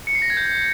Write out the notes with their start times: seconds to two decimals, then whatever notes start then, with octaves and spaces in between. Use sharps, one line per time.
0.07 C#7
0.15 C7
0.22 A#6
0.30 G#6
0.37 G6